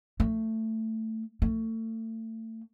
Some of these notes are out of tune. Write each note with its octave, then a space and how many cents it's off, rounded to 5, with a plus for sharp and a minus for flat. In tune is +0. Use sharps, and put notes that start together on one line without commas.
A3 +15
A3 +30